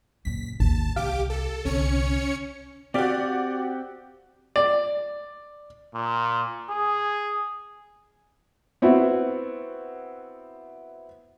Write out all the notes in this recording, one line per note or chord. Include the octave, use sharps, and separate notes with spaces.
F#2 A#2 B6
G#1 D#2 A5
C2 G4 F5 D6
A4
C2 D3 C#4 C#5 C#7
C4 F#4 G4 D5 F5
D5
A#2
G#4
B3 C4 E4 F#4